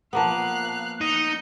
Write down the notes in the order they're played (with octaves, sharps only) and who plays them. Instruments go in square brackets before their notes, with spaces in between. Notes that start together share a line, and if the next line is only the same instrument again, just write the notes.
[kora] F3 A#3 B3 [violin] F5 F#6 [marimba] F#5 A5
[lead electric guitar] D#4 [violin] G6 C#7